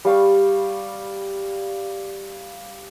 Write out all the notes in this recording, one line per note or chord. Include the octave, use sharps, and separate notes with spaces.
G3 F5 C#6